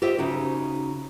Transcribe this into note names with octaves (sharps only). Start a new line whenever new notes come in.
G4 C5 D#5 E5
C#3 D#4 F#4